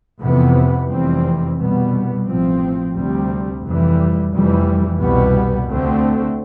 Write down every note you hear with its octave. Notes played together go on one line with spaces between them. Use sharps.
F2 C3 E3 B3
F1 F2 E3 G3 C4
C2 B2 G3 B3
A1 A2 F3 C4
D2 C3 G3 C4
F1 F2 E3 G3
F1 F2 E3 G3
C2 B2 G3 B3
D2 D3 A3 C4